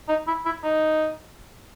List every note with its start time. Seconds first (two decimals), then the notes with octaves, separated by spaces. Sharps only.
0.09 D#4
0.27 E4
0.45 E4
0.64 D#4